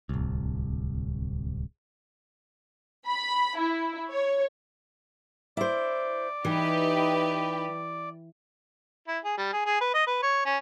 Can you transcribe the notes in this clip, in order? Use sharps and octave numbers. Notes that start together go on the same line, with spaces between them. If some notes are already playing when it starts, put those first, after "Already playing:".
D1 C2
B5
E4
C#5
E4 C5 D5
E3 D#4 G4 B4
E4
G#4
G3
G#4
G#4
B4
D#5
B4
C#5
C#4